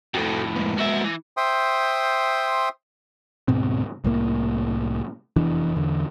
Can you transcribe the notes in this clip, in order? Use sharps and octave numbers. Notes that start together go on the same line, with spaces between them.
F2 A2 F#4 A4
G#3 A#3 B3
F#4 E5
E3
C5 E5 G5 C6 D#6
D2 G#2 B2 C4
C2 A2 A#3
F1 E2 E3 D4
E2 D3